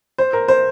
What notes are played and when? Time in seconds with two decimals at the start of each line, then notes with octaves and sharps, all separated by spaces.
0.18 C5
0.33 A#4
0.48 C5